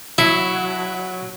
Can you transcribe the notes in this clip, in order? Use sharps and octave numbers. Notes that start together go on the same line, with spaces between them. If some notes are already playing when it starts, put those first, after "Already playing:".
F#3 E4